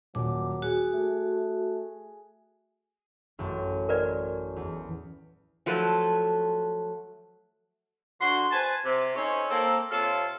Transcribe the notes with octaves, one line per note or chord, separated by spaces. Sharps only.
D#1 F#3 D6
F#4 G#4
A3
A1 F#2
A#4 B4 D5
E2
F3 F#3 A3 A4 B4
D3 F#4 C6
B4 C5 G#5 A5
C3
C#4 D#4 A4 C5 C#5
A#3 C4 A4
C3 F4 A4 C#5 F5 A5